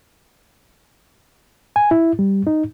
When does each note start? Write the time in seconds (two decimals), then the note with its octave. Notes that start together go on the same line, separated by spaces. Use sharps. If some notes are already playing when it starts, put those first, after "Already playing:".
1.76 G#5
1.91 E4
2.19 G3
2.47 D#4